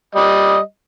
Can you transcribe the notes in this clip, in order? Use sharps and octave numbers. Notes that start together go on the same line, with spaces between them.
G3 D#5